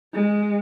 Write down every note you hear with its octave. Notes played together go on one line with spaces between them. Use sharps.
G#3